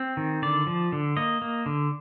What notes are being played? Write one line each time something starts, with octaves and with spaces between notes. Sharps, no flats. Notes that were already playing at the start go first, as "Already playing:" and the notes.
Already playing: C4
D#3
D3 D5
F3
D3
A#3 D#5
A#3
D3